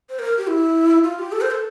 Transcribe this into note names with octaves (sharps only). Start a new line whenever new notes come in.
C5
A#4
G4
E4
F4
G4
A4
C5
A4